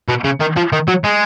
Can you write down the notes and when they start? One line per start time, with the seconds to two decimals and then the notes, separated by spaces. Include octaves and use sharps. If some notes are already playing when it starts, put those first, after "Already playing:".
0.09 B2
0.25 C#3
0.41 D#3
0.57 F3
0.73 D#3
0.88 F#3
1.04 G#3